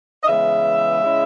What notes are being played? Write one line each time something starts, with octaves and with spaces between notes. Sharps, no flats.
D#5
C#3 E3 G#3 B3 E5
C#3 G#3 C#4 E4